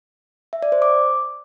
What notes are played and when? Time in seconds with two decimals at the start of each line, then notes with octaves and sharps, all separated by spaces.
0.53 E5
0.62 D5
0.72 C5
0.82 D6